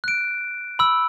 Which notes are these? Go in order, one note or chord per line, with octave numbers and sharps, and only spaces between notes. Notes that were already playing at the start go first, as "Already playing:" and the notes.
F#6 D7
B5 E6